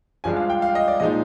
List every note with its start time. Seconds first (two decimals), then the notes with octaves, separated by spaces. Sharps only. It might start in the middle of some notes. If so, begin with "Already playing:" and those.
0.24 G2 F3 G#3 D4 G#5
0.36 F5
0.50 G5
0.62 F5
0.75 D#5
0.88 D5
1.00 A#2 F3 G#3 D#4 D#5